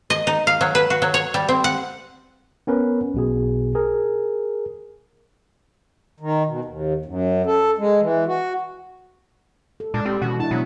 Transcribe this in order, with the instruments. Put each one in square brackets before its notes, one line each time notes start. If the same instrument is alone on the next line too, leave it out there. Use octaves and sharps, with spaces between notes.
[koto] D#5
D#4
F5
F#3
B4
F#4
F#3
C#5
G3
C4
F#5
[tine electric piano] B3 C#4 A#4 B4
B1 B2 G#4
G#4 A#4
[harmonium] D#3
B2
D#2
F#2
A4
G#3
E3
F#4
[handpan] A4
[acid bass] A#2 [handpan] G#3 [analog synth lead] D4
[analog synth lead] G3 [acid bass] C4
[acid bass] B2 [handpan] E3 C#4 [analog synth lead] F#4
[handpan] D4 E4 [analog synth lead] A5
[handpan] B2 [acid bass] F#3 [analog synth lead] B3